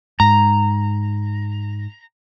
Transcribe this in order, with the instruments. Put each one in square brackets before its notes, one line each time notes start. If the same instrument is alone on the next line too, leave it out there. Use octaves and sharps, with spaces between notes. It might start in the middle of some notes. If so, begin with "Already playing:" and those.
[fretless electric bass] G#2 [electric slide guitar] A#5